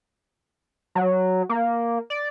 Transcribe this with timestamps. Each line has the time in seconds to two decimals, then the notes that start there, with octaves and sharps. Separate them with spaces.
0.95 F#3
1.49 A#3
2.10 D5